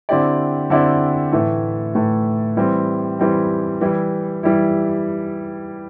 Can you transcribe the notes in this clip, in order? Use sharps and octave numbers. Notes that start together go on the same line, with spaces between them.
D3 C4 E4 G4 D5
D3 C4 E4 G4 D5
A2 E3 A3
A2 E3 A3
E3 G3 C4
E3 G3 C4
E3 G3 E4
E3 G3 E4